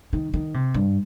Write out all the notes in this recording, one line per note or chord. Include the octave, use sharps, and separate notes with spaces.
D#3
D#3
C3
G2